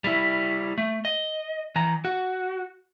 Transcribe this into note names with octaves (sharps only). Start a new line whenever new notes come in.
G3 E4
A3
D#5
E3 A#5
F#4